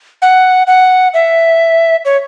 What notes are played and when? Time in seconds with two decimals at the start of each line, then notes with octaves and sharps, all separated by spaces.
0.22 F#5
0.67 F#5
1.14 E5
2.05 C#5